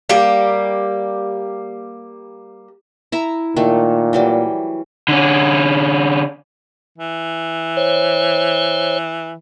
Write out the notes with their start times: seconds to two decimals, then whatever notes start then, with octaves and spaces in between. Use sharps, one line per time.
0.09 G3 A#3 G4
3.12 E4 E5 A#5
3.56 A#2 D#3 A3
4.13 E3 F#3 G3
5.08 D3 C#4
6.98 E3
7.77 C5 C#5